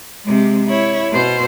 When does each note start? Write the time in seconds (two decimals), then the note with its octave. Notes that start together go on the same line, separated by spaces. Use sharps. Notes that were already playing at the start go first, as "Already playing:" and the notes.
0.24 C3 G#3
0.67 E4 C#5
1.11 B2 C5